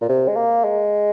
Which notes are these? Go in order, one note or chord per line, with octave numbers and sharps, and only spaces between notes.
A#2
C3
G#3
A#3
G#3